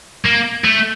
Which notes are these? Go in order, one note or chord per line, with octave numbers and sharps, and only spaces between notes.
A#3
A3